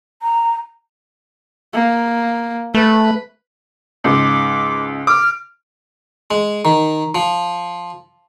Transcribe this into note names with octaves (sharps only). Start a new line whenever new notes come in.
A#5
A#3
A3 B4
C#2 G#2 D6
D6 F6
G#3
D#3
F3